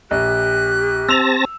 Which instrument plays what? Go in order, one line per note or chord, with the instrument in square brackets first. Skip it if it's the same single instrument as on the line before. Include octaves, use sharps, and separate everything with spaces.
[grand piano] A#1 [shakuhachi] G4 [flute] F#6
[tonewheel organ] C4 A5 A#6 [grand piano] E6 E7 F7